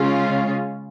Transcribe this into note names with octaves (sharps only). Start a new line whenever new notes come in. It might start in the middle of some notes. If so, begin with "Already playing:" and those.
Already playing: C#3 G#3 C#4 F4 G#4